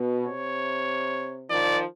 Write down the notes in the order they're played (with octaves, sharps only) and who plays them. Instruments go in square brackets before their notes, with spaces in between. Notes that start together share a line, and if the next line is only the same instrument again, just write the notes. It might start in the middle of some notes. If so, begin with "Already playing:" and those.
Already playing: [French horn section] B2
[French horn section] C3 [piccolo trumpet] C#5
[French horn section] D#3 F3 [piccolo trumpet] D5